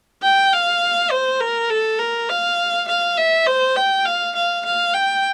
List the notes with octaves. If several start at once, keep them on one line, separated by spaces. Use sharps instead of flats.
G5
F5
C5
A#4
A4
A#4
F5
F5
E5
C5
G5
F5
F5
F5
G5